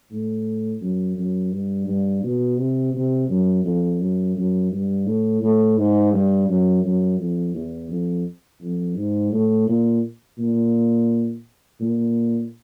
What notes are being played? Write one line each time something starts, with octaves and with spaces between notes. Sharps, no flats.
A2
F#2
F#2
G2
G2
B2
C3
C3
F#2
F2
F#2
F#2
G2
A2
A2
G#2
G2
F#2
F#2
F2
E2
F2
F2
G#2
A2
A#2
A#2
A#2